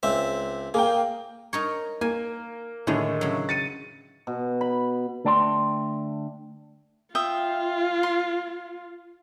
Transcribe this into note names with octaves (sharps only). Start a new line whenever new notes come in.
C#2 C4 E5
A#3 G#4 A#4 G5
D#4 A#4 C#5
A#3 G#5
A2 D3 D#3 G#3 A3
C#3 F#3
A6 C#7 D#7
B2
B5
D3 A3 D5 G5 A5 C6
F4 E5 G5 D#6
C6